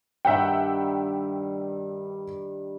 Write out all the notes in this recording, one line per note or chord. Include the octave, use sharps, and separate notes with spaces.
G2 D#3 G3 E5 F#5 G5